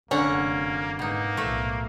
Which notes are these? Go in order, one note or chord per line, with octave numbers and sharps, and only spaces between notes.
F1 F#2 D3 A#3 C#4 F#5 A#5
G#2 B2 A#3 D#4
B1 A2 F3 A3 E5